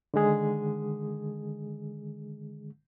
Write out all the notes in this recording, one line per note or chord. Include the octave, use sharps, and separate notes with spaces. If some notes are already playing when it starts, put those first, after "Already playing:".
D3 D#3 G#3 G#4